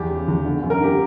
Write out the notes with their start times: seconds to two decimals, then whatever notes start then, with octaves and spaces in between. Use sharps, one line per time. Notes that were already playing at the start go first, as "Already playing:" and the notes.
Already playing: E2 G4
0.10 C#3
0.28 E2
0.45 D3
0.63 F#2
0.70 A#4
0.80 D3 G4